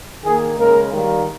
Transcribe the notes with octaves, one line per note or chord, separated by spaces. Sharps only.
D#3 A#3 G#4
C#3 G#3 A#4
D#3 G3 A#3